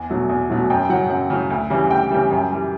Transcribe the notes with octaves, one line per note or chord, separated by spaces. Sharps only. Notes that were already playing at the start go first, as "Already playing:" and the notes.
Already playing: E2
B2 F#3 A3
E2
B2 F#3 A3
F#2 G5
G5
C#3 F#3 F#5
F#2 F#5
C#3 F#3
D2
C#3 E3 G3
D2 G5
C#3 E3 G3
F#2
E3 G3